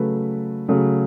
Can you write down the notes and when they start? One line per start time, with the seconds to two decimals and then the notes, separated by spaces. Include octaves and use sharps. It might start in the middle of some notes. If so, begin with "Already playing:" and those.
Already playing: C#3 F#3 A3 B4
0.69 C#3 F#3 A3